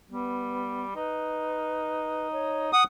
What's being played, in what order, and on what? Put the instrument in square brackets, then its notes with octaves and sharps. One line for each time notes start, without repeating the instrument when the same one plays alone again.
[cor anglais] G3 [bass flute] B3
[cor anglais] D#4 [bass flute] B4
[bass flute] C#5
[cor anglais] F#5 [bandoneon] D#6